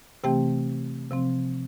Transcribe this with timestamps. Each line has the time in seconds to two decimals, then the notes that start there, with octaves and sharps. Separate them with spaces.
0.24 C3 E3 A3 C4 G4 G5
1.11 C3 F3 C4